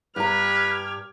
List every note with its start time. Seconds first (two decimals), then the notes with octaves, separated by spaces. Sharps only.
0.16 G2 G4 B4 A#5 F6 G#6